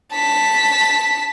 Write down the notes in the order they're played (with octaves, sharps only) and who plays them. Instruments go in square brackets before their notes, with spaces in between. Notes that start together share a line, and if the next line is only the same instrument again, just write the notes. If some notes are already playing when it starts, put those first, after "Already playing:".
[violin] A5 B6